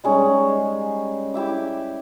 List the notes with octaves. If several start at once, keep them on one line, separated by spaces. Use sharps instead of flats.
G3 G#3 C#4 D#4
E4 G4 E5 D6